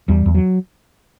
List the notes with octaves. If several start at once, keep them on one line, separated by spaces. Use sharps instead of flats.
E2 G3
E2
F#3